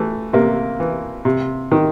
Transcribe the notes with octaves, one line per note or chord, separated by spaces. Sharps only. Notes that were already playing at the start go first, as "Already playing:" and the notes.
Already playing: E3 A3
C3 A#3
E3
C3
D#3